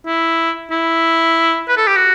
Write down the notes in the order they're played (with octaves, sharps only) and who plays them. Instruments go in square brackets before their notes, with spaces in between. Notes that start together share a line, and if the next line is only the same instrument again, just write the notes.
[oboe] E4
E4
B4
A4
G4
F#4